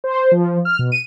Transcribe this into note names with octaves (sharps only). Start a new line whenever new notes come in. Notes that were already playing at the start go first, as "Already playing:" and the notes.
C5
F3
F6
B2
D#7